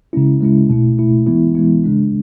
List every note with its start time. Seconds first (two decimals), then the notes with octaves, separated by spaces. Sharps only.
0.13 C#3 G#3 C#4 E4
0.41 C#3 G#3 C#4 E4
0.70 B2 A3 E4
0.98 B2 A3 E4
1.27 E3 G#3 B3 E4
1.55 E3 G#3 B3 E4
1.84 C#3 G#3 D4